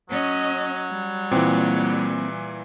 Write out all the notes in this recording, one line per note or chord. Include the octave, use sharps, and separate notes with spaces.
F#3 C#4 D#5
G3
A#2 E3 A#3 C4